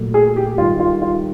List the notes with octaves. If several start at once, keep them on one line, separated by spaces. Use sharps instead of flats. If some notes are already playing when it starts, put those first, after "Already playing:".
Already playing: A#2 F#3 A3
G#4
G4
G#2 D#3 G3 F4
F4
F4